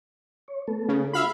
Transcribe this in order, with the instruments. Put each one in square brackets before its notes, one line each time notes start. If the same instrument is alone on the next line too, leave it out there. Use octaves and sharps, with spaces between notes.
[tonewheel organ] C#5
A3 B3 A4
[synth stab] C#3
[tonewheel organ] D4 F4 F#4 [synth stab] E5 F5 B5